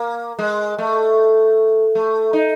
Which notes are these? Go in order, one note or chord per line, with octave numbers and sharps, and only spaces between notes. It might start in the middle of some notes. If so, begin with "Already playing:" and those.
Already playing: A#3
G#3
A3
A3
D#4